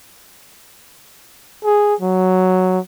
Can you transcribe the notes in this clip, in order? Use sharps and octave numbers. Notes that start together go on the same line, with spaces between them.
G#4
F#3